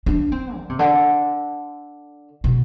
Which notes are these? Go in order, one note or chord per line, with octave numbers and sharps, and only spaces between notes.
D4
C4
D3
C3
D3
B2